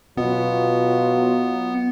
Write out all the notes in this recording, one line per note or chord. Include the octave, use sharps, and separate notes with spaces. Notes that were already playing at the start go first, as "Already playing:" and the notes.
B2 F#3 B3 F4